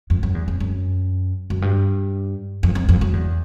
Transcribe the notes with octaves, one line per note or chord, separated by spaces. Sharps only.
F2
F#2
E2
F2
F#2
F#2
G2
F2
F2
F2
F#2
E2